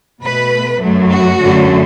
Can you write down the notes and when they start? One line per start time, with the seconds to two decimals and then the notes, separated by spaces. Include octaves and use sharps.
0.22 B2 A3 B4
0.80 F#2 F#3 A3
1.11 F#4
1.41 F#2 D3 F#3 A3